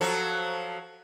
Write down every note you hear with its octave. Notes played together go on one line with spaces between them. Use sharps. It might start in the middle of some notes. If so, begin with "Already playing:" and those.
F3 F#3 A4